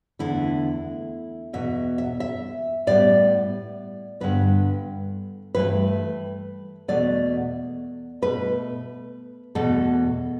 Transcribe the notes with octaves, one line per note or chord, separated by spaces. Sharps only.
E2 D3 A3 E4
E2 B2 B3 E5
E5
E5
A2 G3 B3 D5
G2 D3 B3 B4
G2 E3 A3 B4
E2 B2 A3 D5
B2 A3 B4
E2 B2 A3 A4